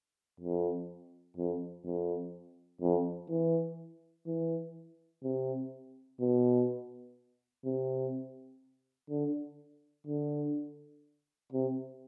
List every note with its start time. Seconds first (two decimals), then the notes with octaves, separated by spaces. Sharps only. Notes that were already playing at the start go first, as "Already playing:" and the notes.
0.40 F2
1.37 F2
1.85 F2
2.81 F2
3.30 E3
4.26 E3
5.23 C3
6.20 B2
7.65 C3
9.10 D3
10.07 D3
11.52 C3